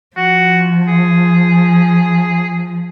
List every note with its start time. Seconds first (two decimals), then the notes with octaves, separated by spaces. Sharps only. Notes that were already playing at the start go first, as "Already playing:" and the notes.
0.16 F3 F#4
0.88 G#4